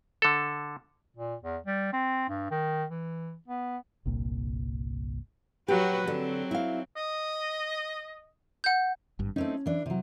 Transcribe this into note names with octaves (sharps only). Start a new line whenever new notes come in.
D3 A4
A#2
E2
G3
C4
G2
D#3
E3
B3
G1 C2 A#2
F#3 F#4 G4 B4
D3 F#3 C4
E4 F5
D#5
F#5 G6
G#1 G2
A3 C4 C#4 D#4
E3 D4
C3 F#3